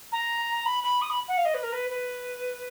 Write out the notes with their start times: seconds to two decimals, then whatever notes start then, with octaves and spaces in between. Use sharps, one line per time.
0.12 A#5
0.65 B5
0.83 B5
1.01 D#6
1.10 B5
1.28 F#5
1.37 F5
1.45 D#5
1.54 B4
1.62 A#4
1.72 B4
1.89 B4